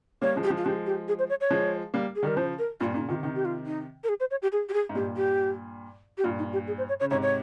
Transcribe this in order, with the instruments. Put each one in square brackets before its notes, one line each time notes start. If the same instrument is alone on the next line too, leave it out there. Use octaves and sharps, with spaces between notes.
[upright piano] G3 A#3 [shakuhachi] C#5
[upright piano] F3 G#3
[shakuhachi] G4
[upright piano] F3 G#3
[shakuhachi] F4
[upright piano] F3 G#3 [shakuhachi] G4
[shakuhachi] G4
G#4
C5
C#5
C#5
[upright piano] F3 G#3
G3 A#3
[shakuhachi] G#4
[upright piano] D#3 G3 [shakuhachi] A#4
[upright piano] C#3 F3 [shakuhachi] C5
[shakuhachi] A#4
[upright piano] G2 A#2 [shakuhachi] F4
[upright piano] A#2 C#3 [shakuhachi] D#4
[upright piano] C3 D#3 [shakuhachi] F4
[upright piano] C3 D#3 [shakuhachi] D#4
[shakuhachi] G4
F4
D#4
A#4
G#4
C5
C#5
G4
G#4
G4
G#4
[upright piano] G#2
[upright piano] G2 A#2 [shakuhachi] G4
[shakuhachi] G4
G4
[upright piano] G2 A#2 [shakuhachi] F4
[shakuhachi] D#4
G4
G#4
C5
C#5
[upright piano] C#3 [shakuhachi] C#5
[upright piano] G#2 C3 [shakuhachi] C#5
[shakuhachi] C#5